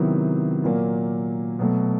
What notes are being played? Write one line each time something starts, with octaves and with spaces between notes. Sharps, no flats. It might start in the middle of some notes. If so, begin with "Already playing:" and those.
Already playing: C3 D#3 F#3 B3 E4
A#2 F#3 A#3
B2 F#3 A3